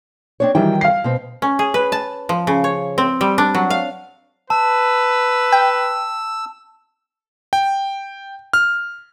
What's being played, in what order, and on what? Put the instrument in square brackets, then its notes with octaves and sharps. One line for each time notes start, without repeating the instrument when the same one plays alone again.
[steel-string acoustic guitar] C4 D4 C#5
[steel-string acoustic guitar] D#3 F#3 G5 [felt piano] E3 G3
[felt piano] F5 C7
[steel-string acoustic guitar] B2 C4
[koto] C#4
G#4
B4
A5
F3
C#3
C#5
C4
G3
D4
F#3
F5
[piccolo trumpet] B4 [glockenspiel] A5 [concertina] E6
[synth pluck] G5
[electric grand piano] G5
F6